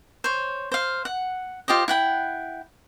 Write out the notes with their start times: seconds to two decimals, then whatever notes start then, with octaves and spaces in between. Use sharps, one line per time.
0.24 C5 C#5
0.72 C5 F5
1.05 F#5
1.68 F4 G4 C5 D#5
1.88 E4 F#5 G5